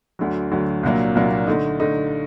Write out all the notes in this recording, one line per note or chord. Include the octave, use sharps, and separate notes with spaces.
D2 D3 F#3
D2 D3 F#3
C2 A#2 F#3 A#3 D4
C2 A#2 F#3 A#3 D4
D3 A3 D#4
D3 A3 D#4